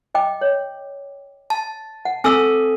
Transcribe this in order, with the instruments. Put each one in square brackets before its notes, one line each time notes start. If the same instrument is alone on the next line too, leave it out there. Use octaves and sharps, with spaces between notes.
[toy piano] D#5 G5 D6
C#5
[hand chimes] A5
[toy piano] F#5
[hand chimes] C4 A4 [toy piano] G#5 D6 E6